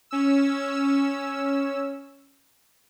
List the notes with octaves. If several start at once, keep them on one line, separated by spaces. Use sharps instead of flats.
C#4 E6